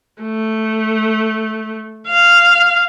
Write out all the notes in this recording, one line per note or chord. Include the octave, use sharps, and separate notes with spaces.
A3
F5